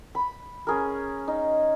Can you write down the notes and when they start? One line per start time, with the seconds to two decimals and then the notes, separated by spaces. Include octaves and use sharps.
0.15 B5
0.67 C#4 G#4 A#4
1.28 D#4